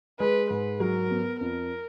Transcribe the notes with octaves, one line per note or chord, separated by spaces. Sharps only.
G#3 B4
G#2 B4
F#3 A#4
B3
F2 A#4